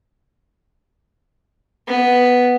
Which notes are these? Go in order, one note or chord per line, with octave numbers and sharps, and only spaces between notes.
B3